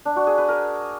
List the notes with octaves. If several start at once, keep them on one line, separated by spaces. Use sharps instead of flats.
D4
F#4
G#4
B4
A#4